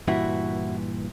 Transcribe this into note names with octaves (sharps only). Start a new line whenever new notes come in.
G2 A#2 E3 E4 F#4